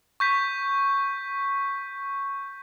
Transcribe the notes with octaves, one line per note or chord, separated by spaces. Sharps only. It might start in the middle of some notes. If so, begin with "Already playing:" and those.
C#6 G6 B6